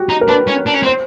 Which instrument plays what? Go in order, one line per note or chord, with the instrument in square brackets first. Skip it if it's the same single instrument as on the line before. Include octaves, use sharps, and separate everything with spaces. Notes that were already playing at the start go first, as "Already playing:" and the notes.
Already playing: [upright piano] F#4 G4
[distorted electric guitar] D#4
[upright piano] A#4
[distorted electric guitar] D4 [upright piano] B4
[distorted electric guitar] C#4
D4
C#4
C4
[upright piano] C5